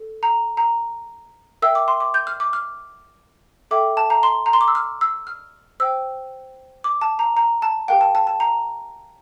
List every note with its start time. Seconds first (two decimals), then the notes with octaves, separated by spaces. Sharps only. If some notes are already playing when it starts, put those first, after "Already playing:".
Already playing: A4
0.23 A#5
0.57 A#5
1.62 A#4 E5 G5 E6
1.75 D6
1.88 C6
2.00 D6
2.14 G6
2.27 F6
2.40 D6
2.53 F6
3.71 A4 E5 G5 D6
3.97 A5
4.10 A#5
4.23 C6
4.46 A#5
4.53 C6
4.61 D6
4.68 E6
4.75 F6
5.01 E6
5.27 F6
5.80 C5 G5 E6
6.84 D6
7.01 A5
7.19 A#5
7.37 A#5
7.62 A5
7.88 G4 A#4 F5 G5
8.01 A5
8.15 A5
8.27 A5
8.40 A#5